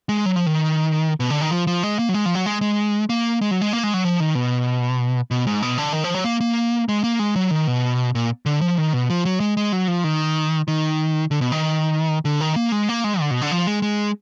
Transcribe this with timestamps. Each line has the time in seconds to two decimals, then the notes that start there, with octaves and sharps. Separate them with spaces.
0.09 G#3
0.26 F#3
0.36 F3
0.46 D#3
1.20 B2
1.30 D3
1.41 D#3
1.51 F3
1.67 F3
1.83 G#3
1.99 A#3
2.09 F#3
2.14 G#3
2.26 F3
2.35 F#3
2.46 G#3
2.61 G#3
3.09 A#3
3.41 G#3
3.51 F#3
3.62 G#3
3.73 A#3
3.84 G#3
3.94 F#3
4.04 F3
4.20 D#3
4.35 B2
5.31 B2
5.47 G#2
5.62 B2
5.78 D3
5.93 D#3
6.04 F3
6.14 F#3
6.24 A#3
6.41 A#3
6.89 G#3
7.04 A#3
7.19 G#3
7.36 F#3
7.51 D#3
7.67 B2
8.15 A#2
8.46 D3
8.61 F3
8.78 D#3
8.93 B2
9.10 F3
9.25 F#3
9.40 G#3
9.57 G#3
9.72 F#3
9.88 F3
10.04 D#3
10.68 D#3
11.31 D3
11.41 B2
11.52 D#3
12.25 D3
12.41 D#3
12.56 A#3
12.72 G#3
12.89 A#3
13.04 G#3
13.20 D3
13.31 B2
13.41 D3
13.51 F3
13.67 G#3
13.82 G#3